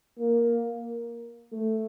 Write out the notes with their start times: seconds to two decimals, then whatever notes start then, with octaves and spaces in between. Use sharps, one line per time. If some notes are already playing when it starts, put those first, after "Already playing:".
0.19 A#3
1.52 A3